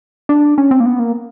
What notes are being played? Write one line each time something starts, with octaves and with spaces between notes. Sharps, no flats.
D4
C#4
C4
A#3
B3
A#3